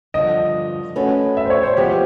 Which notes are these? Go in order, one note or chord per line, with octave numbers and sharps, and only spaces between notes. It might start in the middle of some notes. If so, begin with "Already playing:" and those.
G2 D3 F3 D#5
A3 C#4 F#4 B4
E5
C5
C#5
C5
F3 G#3 B3 G4